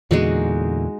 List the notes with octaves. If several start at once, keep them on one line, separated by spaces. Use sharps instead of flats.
E2 A#2 D3 G#3 D#4 F#4